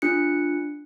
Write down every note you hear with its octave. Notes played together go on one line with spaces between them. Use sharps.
D4 F4 F#6 C#7